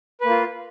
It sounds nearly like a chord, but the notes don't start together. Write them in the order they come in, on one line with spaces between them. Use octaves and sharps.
B4 A#3 F4